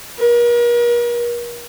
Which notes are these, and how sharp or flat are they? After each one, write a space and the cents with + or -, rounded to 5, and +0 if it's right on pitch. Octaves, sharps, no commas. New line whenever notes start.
A#4 +40